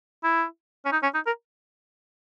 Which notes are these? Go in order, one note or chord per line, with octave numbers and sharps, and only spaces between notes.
E4
C#4
D#4
C#4
D#4
A#4